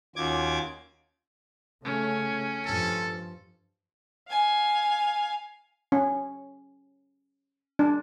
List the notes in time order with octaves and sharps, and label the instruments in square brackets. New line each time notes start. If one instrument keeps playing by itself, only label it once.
[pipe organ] D#2 D6 G#6 [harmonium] C#4 F4 F#4
[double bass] C#3 A3 [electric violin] C#4
[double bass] G2 F3 [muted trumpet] A4
[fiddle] F5 G#5
[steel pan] C#4
D4